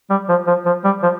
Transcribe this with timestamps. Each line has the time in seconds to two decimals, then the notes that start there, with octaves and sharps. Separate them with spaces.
0.10 G3
0.29 F3
0.47 F3
0.66 F3
0.85 G3
1.03 F3